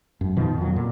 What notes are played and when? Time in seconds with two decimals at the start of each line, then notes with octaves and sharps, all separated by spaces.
0.21 F#2
0.37 B2 D#3 F3
0.58 F2 F#3
0.76 A#2